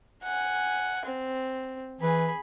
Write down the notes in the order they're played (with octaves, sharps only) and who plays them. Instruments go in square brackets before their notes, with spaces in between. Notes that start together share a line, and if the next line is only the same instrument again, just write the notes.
[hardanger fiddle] F#5 G#5
C4
[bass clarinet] E3 [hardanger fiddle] G#4 B5